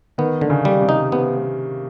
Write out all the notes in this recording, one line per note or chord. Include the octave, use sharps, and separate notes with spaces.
D#3 B3
D3
C#3
G3
C3
D#4
C3 B3